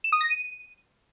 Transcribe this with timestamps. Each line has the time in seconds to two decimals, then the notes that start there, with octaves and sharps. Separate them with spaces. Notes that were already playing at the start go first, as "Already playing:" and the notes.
0.04 E7
0.12 D#6
0.21 A#6
0.29 D#7